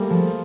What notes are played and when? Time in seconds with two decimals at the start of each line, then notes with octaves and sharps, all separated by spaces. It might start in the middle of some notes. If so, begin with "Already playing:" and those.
Already playing: G3 A3 A#3 G#4
0.10 F3